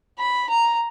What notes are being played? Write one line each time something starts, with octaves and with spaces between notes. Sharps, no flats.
B5
A#5